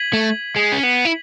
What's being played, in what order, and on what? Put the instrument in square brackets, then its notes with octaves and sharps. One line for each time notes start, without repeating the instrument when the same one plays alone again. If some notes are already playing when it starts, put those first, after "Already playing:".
Already playing: [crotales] G#6 B6 D#7 F#7
[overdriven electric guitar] A3
G#3
C#4
B3
E4